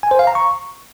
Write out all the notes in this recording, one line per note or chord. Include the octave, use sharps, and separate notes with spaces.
G#5
C5
F5
A#5
C#6